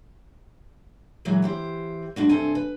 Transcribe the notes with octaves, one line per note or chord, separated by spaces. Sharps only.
A#2 E3 F#3 G#3
E3 G4 C5
G3 G#3 D4 F#4
G2 C3 A4 C5 G#5
B4